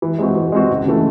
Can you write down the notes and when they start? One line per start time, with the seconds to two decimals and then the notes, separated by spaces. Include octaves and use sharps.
0.02 E3
0.19 G#3 C4 F#4
0.36 E3
0.52 G#3 C4 F#4
0.70 C#2
0.86 C#3 E3 A3